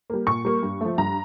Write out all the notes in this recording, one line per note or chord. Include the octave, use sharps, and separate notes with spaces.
G3 A#3
A#2 C#6
G3 A#3
G2
F3 A3
G2 A#5